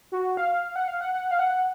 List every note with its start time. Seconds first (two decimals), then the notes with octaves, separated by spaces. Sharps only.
0.12 F#4
0.37 F5
0.76 F#5
0.88 F5
1.01 F#5
1.14 F#5
1.31 F5
1.39 F#5